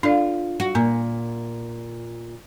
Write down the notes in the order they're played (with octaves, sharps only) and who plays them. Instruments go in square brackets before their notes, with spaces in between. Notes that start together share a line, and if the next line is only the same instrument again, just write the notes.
[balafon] D4 A4 D5 [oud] F4
[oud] F#4
[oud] A#2 [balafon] A#3 A#5